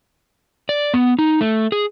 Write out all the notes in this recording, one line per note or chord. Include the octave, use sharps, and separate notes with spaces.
D5
B3
D#4
A3
G#4